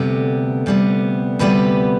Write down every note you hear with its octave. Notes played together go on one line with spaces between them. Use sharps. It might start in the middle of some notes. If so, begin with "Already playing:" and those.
Already playing: D2 C3 G3 B3 A4
D2 C3 G3 B3
D2 C3 G3 B3 B4